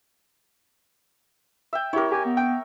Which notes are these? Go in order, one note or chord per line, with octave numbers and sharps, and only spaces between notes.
E5 G5
E4 G4 A#4 C#5
G4 G#5
B3
G5